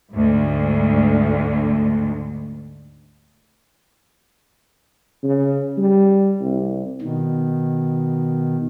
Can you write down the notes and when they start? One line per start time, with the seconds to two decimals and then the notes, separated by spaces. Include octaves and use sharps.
0.13 D2 G#2
5.23 C#3
5.77 G3
6.41 C2
7.01 B2 D#3